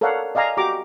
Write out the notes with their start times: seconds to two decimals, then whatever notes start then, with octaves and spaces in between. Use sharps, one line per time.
0.01 A4 A#4 C#5 D5 F5 F#5
0.35 D5 D#5 F5 G#5 A#5
0.57 F#4 G4 A#5 D6